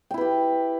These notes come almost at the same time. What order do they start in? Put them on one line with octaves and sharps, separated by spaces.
G5 E4 B4 G4